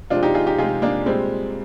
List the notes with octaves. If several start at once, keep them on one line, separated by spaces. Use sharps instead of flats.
C3 F3 G#3 D4 F4
D#4 G4
F4 G#4
D#4 G4
C3 F3 G#3 F4 G#4
A#3 D4
A#2 G3 G#3 C4